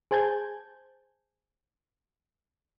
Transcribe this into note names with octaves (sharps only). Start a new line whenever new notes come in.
G#4 C5 G#5 A5 G6 G#6